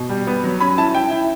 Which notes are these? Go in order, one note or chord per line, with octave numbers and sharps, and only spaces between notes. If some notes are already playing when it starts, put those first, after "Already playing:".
Already playing: B2
G3
B3
F#3
C#4 B5
E4 A5
E4 G5
E4